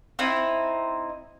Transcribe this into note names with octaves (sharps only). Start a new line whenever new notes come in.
C4 D#4 E4